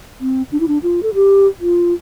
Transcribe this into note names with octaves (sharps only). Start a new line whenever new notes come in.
C4
D4
E4
D4
F4
A4
G4
F4